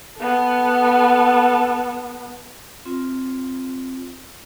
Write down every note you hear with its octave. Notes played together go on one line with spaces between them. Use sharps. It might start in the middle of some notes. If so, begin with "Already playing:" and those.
B3 A4
C4 F4